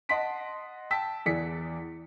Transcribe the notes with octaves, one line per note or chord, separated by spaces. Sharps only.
D#5 F#5 A5 C6 B6 D7
G5 A5 E6 B6
E2 E3 G#4 D5 B6 C#7